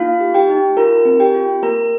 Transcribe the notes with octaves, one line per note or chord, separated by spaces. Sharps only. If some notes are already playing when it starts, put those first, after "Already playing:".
Already playing: A#3 D#4 F4 F5
G4
G4 G5
D#4
F4 A#4 A#5
C4
G4 G5
F4
A#3 A#4 A#5